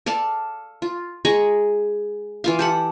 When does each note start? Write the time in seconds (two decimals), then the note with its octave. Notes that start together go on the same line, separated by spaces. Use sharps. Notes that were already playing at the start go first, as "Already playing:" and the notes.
0.06 A4 D5 F5 A5
0.82 F4
1.25 G#3 G#4 A#5 C#6
2.44 E3 F4 F5
2.59 G4 A4 F#5